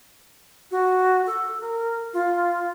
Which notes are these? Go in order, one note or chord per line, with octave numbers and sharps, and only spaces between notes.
F#4
A4
A#4
F4